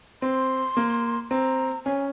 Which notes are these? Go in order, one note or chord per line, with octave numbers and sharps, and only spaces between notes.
C4 C6
A#3
C4 A#5
C#4 G#5